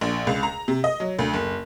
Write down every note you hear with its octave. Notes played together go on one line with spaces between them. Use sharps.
A#1
C#2
A#5
C3
D#5
F#3
D2
F#1